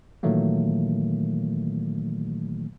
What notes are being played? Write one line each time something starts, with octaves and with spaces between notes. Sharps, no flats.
A#2 D#3 E3 F#3 A3 A#3